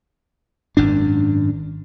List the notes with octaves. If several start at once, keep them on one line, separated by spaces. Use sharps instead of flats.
G#1 F#2 D4